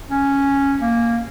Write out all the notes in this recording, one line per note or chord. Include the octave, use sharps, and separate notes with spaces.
C#4
A#3